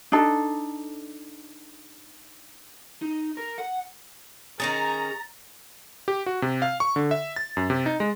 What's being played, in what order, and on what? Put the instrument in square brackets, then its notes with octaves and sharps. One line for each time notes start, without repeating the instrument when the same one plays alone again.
[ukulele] D4 D#4 A4
[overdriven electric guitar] D#4
A#4
F#5
[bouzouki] D#3 C#4 G#4 [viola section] A#5 [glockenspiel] A6
[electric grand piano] G4
F#4
C3
F5
C#6
D3
E5
A6
F#2
C3
D#4
G#3